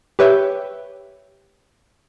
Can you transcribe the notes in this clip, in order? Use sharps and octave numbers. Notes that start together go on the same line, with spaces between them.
G4 B4 C#5 E5 G5